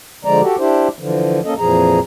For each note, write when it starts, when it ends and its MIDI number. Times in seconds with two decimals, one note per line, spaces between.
0.25 0.41 50
0.25 0.41 53
0.25 0.41 56
0.25 0.41 74
0.25 0.41 82
0.42 0.56 66
0.42 0.56 67
0.42 0.56 69
0.59 0.88 62
0.59 0.88 64
0.59 0.88 67
0.59 0.88 72
0.99 1.40 50
0.99 1.40 52
0.99 1.40 53
1.45 1.54 58
1.45 1.54 61
1.45 1.54 69
1.45 1.54 75
1.59 2.00 41
1.59 2.00 46
1.59 2.00 52
1.59 2.00 53
1.59 2.00 68
1.59 2.00 82